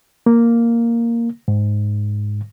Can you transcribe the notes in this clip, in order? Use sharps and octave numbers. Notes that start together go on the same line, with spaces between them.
A#3
G#2